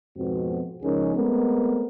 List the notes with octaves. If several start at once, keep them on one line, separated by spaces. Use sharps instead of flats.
F2 G#2 B2 B3 C4 F#4
C#2 F3 C#4 D#4 G#4 A#4
G#3 A3 B3 C4 A#4